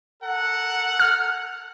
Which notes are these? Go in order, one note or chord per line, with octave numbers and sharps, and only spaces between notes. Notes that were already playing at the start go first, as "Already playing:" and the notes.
A4 A#4 F#5
F6